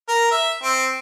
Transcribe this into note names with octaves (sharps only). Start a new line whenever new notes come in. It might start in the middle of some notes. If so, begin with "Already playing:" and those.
A#4
E5
C4